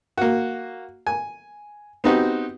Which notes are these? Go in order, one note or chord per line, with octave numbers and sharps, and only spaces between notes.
A#3 F#4
G#5
B3 C4 D#4 F#4 G4